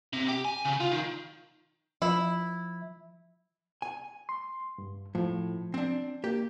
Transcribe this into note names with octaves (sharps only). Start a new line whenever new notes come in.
C3
G4
G#5
C#3
F4
D#3
F3 E4
G#5
C6
G2
A2 F3
C4 D4
A#3 G4